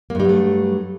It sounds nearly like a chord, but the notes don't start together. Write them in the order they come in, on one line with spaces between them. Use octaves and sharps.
A#3 G2 G3 F#3 A3